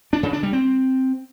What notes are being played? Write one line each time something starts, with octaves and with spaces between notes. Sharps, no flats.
D4
C#3
D4
G3
C4